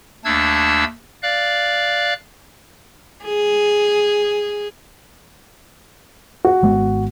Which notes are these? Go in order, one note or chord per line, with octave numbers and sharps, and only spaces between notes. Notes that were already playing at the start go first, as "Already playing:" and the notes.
D#2 A3 D4 A5 E6 G#6
D5 F5 F#6
G#4
F#4
G#1 G#3 B3